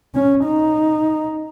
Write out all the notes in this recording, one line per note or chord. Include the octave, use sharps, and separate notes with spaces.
C#4
D#4